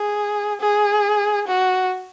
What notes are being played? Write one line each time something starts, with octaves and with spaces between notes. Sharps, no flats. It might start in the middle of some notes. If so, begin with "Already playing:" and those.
Already playing: G#4
G#4
F#4